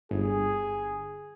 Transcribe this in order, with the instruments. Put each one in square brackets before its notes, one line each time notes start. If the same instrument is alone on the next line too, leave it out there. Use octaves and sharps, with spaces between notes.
[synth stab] G1 [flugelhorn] G#4